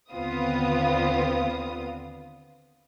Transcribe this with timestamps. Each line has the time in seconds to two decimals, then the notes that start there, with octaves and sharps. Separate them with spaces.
0.12 D#2 D3 B3 C4 F4 D#6